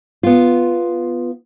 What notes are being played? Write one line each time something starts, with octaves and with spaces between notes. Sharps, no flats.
B3 F4